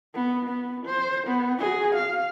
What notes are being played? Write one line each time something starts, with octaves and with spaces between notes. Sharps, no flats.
B3
B3
C5
B3
F#4 G#4
F5